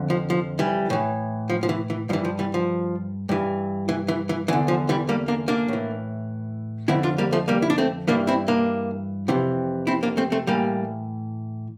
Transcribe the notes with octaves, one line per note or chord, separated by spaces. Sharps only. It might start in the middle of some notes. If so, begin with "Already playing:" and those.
Already playing: F2 D3
F3
F3
E3 G3
A2 E3
F3
F3
E3
E3
G2 E3 F3
F3
E3 G3
F3
G2 E3
E3
E3
E3
E2 D3 E3
F3
E3 G3
G3 A#3
A#3 D4
A#3 D4
A2 E3
F2 D3 C4 E4
D4 F4
G3 A#3
F3 A3
G3 A#3
E4
D4
A3 C4
G2 E3 A#3 D4
C4 E4
A#3 D4
F2 C3 E3
C4 E4
A#3 D4
A3 C4
A3 C4
A2 E3 G3 A#3